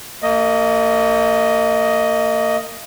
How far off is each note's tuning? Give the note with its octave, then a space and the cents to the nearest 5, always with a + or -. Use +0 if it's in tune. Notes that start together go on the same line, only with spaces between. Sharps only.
A#3 -35 D#5 +0